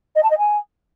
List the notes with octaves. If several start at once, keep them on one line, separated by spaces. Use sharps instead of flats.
D#5
A5
D#5
G#5